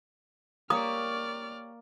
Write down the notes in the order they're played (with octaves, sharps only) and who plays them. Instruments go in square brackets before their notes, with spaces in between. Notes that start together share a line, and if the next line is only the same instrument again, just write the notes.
[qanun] A#3 [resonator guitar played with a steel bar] G4 C#5 [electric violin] D5 F6 [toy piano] D#6